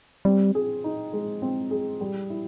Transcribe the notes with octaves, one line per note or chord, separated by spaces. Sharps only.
G3 C4
G#4
D#4
G#3
C4
G#4
G3
E4